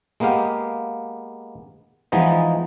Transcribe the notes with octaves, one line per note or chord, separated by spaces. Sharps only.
G#3 A#3 B3 G4 F5
E3 F3 G#3 B3 D#4 D#5